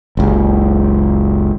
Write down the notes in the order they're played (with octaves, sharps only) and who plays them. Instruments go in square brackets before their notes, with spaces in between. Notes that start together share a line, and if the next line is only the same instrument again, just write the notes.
[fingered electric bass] F#1 C#2